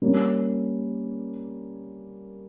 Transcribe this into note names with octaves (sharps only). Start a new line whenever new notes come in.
G3 A#3 C#4